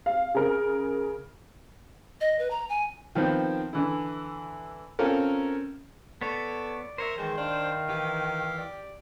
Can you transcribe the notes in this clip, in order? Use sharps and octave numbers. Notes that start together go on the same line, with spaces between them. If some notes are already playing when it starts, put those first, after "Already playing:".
F5
C#3 A#4
D#5
B4
A#5
G#5
D#3 F3 B3 C4
D3 E3 E4
C4 C#4 F4 A4 A#4
B3 A4 C#5 D5
A#4 C5 C#5 E5
D#3 E3 G#3 C5
D#3 D4 F5
E3 G4
D5